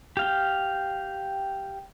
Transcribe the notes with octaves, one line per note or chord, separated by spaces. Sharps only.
G4 F5 G5